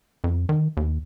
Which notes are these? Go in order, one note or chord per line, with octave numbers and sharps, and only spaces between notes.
F2
D#3
D#2